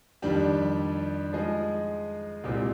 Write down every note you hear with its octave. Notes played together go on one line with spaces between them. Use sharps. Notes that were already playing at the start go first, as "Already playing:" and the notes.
F2 D#3 G3 D4 G4
F3 G#3 D#4 G#4 D#5
C2 A#2 G#3 C4 G4